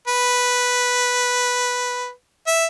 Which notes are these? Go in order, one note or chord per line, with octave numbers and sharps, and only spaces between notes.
B4
E5